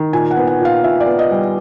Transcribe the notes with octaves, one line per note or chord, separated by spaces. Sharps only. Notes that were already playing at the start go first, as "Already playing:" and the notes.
Already playing: D#3
A#2 G#5
F#5
B3
F#5
A#2 F5
A#2 E5
D5
B3
D#5
G3